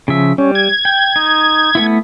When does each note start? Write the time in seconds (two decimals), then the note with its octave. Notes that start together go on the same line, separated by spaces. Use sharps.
0.08 C#3 F3 E5
0.38 G3 C#4
0.55 G#6
0.85 G5
1.16 D#4
1.75 A3 B3 E4